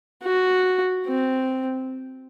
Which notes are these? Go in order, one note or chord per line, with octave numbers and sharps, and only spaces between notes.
F#4
C4